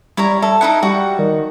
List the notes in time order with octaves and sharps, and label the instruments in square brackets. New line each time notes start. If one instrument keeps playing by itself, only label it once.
[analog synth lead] G3 [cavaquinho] E4 C#5 A#5
[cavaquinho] A4 [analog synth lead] E5
[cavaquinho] D#4 E4 F#5
[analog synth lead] G3 [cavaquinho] F#4
[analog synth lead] D#3